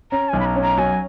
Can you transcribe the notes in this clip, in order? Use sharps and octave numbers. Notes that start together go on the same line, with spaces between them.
C#4 A#5
B1 G#5
B5
A#5
C#4
A#5
F#3 G#5